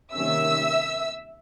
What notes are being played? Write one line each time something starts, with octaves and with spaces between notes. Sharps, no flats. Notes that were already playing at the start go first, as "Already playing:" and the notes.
C3 D#3 G3 A#3 C#4 E5 E6